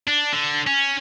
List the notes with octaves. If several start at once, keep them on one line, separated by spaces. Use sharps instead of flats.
D4
D3
C#4